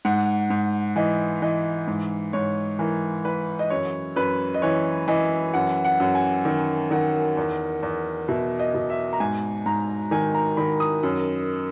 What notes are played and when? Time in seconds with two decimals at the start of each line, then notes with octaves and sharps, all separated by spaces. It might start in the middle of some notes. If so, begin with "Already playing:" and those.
0.05 G#2 F#5
0.50 G#2
0.96 E3 D#5
1.42 E3 D#5
1.88 G#2
2.33 G#2 C#5
2.79 E3 A#4
3.25 E3 B4
3.59 D#5
3.70 F#2 C#5
4.16 F#2 B4
4.54 D#5
4.62 E3 C#5
5.08 E3 D#5
5.54 F#2 F#5
5.85 F#5
6.00 F#2
6.15 G#5
6.45 D#3
6.91 D#3 F#5
7.37 E2
7.83 E2
8.29 B2 E5
8.60 D#5
8.74 B2
8.90 E5
9.13 A#5
9.20 G#2 G#5
9.66 G#2 A#5
10.11 D#3 G#5
10.35 A#5
10.57 D#3 B5
10.80 D#6
11.03 F#2